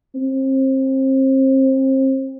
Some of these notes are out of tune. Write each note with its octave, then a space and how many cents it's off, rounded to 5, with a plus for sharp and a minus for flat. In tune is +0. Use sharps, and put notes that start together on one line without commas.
C4 +30